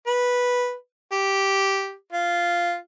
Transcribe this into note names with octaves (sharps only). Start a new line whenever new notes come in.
B4
G4
F4